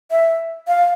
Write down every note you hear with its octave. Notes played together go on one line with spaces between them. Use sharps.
E5
F5